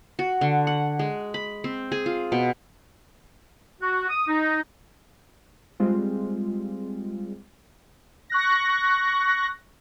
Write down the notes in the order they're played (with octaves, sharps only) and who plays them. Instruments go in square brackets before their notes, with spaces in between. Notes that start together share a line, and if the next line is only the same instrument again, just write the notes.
[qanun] F#4
D3
F#5
G#3
B5
C4
G#4
F4
B2
[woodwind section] F#4
D#6
D#4
[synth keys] G3 G#3 C4 F4
[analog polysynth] C#6 F#6 A#6